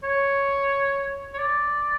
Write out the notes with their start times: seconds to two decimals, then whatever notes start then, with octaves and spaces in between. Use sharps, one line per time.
0.03 C#5
1.34 C#5
1.38 D5